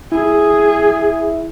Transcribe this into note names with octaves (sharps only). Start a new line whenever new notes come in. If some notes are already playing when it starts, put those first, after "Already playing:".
E4 G#4